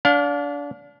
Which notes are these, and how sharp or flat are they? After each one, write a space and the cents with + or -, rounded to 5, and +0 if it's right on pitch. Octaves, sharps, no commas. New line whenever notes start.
D4 -30 F5 +30